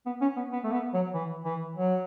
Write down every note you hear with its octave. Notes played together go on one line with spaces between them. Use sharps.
B3
C#4
B3
B3
A3
B3
F#3
E3
E3
F#3